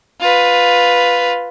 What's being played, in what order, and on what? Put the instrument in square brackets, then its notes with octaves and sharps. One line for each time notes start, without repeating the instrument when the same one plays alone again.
[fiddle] F4 B4